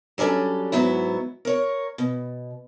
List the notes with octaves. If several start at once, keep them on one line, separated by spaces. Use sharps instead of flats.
F#3 G3 C#4 D4 A4
G#2 F#3 B3 E4
A#4 C#5
B2